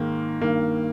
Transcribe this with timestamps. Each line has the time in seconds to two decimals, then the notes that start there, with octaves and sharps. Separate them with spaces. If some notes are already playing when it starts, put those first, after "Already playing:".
Already playing: G#2 D#3 A#3
0.41 G2 D#3 A#3